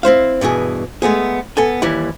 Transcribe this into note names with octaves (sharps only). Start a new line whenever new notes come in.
C4 E4 C5 F5
G2 B2 E3 G#4
G#3 A3 B3 G#4
B3 A4 G#5
D#2 E3 G3 E4